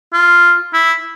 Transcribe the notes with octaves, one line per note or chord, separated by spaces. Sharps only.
F4
E4